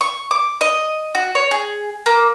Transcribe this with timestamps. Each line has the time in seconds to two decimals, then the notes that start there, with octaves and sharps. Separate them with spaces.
0.01 C#6
0.31 D6
0.61 D#5
1.15 F#4
1.35 C#5
1.51 G#4
2.06 A#3